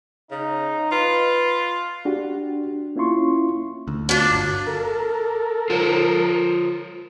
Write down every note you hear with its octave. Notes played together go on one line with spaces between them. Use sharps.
C#3 D#4
F4 B4
D4 F#4 G4
A#3 C#4 E4 F4 C6 C#6
D2
A#2 F#3 D4
G1
A4 A#4
F4 C5 C#5